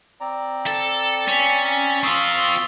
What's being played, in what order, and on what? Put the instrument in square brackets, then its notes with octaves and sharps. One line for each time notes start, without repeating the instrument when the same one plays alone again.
[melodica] C4 D5 A#5
[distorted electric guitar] A4
[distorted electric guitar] C#4 [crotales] A6 B6
[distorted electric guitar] C4 F4 [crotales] C#6 D#6 E6